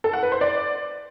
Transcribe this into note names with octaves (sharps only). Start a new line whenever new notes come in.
A4
F#5
B4
C5
D5